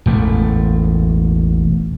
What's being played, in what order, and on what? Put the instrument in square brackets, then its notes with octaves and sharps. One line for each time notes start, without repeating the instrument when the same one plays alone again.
[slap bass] E1 A1 A3